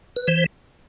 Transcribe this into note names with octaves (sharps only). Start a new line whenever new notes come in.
B4
E3 C5